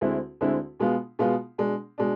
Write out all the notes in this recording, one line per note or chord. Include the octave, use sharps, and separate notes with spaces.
D2 D3 G#3 C4 E4
D2 D3 G#3 C4 E4
B2 G#3 B3 F4
B2 G#3 B3 F4
B2 G#3 D4
B2 G#3 D4